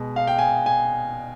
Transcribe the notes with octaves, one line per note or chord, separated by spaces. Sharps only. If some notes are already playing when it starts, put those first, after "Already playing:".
Already playing: B2 G#3
F5
G5
G#5
G#5